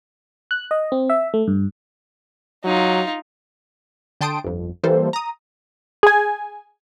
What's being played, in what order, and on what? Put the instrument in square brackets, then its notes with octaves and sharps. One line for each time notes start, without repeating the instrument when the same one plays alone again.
[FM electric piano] F#6
D#5
C4
E5
A3
G2
[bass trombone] F#3 [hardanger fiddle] D#4 F4
[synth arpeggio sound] D3 G5 A5 C6 D#6 D7
G1 F2
E3 G3 A#3 A4 C5
A#5 D#6
[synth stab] G#4 G#5